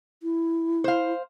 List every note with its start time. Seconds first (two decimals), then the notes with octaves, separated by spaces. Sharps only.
0.23 E4
0.84 C5 F5